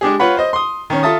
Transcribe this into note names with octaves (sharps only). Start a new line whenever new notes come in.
G#3 D4 G4 G#4
F4 B4 C#5 F#5 B5
C5 D#5
C6 D#6
D#3 C#4
F4 A4 E5 A5 D#6